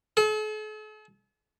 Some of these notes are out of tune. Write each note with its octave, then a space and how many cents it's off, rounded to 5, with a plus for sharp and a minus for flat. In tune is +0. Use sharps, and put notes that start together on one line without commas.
A4 -45